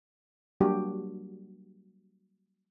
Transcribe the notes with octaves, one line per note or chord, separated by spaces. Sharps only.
F#3 G3 A#3 D4 F#4 G4